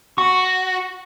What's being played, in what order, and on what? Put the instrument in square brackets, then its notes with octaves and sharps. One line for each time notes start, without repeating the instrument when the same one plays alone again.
[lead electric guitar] F#4 [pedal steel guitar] C#6